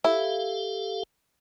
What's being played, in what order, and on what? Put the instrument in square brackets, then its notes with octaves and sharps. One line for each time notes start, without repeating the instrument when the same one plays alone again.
[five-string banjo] E4 [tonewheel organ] G4 A4 F5